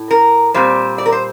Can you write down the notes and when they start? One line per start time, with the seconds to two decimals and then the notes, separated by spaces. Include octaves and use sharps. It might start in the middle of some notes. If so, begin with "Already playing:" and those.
Already playing: A2
0.11 A#4
0.54 A#2 G3 C4 C5
0.98 D5
1.06 A#4
1.12 C5